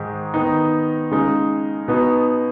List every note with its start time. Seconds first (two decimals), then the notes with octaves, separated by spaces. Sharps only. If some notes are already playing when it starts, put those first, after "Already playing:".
Already playing: G#2 D#3 G#3 D#4
0.34 D#3 B3 D#4
1.11 C#3 G#3 D#4
1.88 B2 B3 D#4